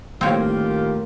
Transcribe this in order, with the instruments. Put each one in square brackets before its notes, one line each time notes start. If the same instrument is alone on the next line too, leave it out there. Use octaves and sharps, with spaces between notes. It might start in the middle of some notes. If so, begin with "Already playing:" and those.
[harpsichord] A2 [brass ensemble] D#3 F4 G4 [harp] A#3 [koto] C4 C#5